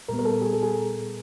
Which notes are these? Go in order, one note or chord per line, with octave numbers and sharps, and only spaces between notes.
A#2 G3 B3 A#4
A#4
A4
G#4
A4
G#4